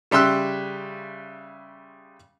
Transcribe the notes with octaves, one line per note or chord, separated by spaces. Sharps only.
C#3 G3 E5 C6 E6 F#6